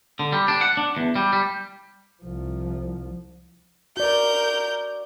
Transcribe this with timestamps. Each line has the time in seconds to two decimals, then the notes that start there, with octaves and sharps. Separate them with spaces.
0.19 D3
0.33 G3
0.48 D4
0.61 F#5
0.77 D4
0.97 E2
1.16 G3
1.33 G3
2.23 C2 F3
3.97 F#4 A#4 D5 G6